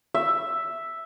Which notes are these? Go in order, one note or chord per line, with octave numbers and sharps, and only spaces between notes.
E5